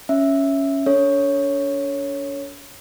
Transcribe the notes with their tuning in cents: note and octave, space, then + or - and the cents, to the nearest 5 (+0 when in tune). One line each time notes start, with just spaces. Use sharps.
C#4 +0 E5 +0
D4 -45 A4 +15 C#5 +0